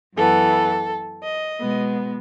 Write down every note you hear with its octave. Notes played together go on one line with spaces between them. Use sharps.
F#2 E3 B3 A4
D#5
B2 G#3 B3